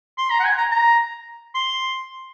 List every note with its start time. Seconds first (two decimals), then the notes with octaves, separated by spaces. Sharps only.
0.18 C6
0.30 A#5
0.39 F#5
0.44 G#5
0.58 A#5
0.71 A#5
1.55 C6